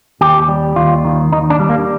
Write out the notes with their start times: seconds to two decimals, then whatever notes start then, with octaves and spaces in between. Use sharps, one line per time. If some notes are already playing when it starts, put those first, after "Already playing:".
0.21 D#2 G4
0.49 G3
0.76 D#2 F4
1.05 D#3
1.32 D#2 D#4
1.50 D4
1.60 G3
1.70 A#3